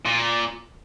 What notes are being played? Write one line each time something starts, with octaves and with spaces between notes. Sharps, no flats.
A#2